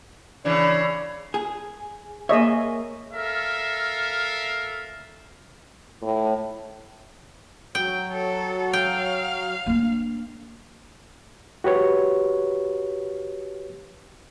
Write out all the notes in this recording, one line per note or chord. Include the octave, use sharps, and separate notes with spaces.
C#3 E3 D4
G#4
A#3 G#4 C#5 D#5 E5
A4 A#4 E5 F5
A2
F#3 G5
A4
F5 G5
A#3 D4
F#4 G4 B4 C#5